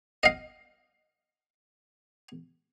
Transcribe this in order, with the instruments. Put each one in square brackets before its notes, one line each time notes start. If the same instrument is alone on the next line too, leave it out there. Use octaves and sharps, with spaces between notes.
[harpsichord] D#5 F5